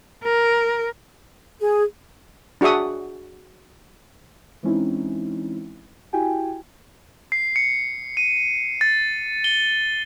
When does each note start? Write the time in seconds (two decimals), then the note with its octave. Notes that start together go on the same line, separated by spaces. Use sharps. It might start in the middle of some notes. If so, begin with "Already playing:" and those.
0.24 A#4
1.61 G#4
2.61 D4 F#4 G#4 E5 D#6
4.63 E3 G#3 C4 C#4 D#4 E4
6.13 E4 F#4 G4 G5 G#5
7.32 C7
7.56 C#7
8.17 D#7
8.81 A6
9.44 G7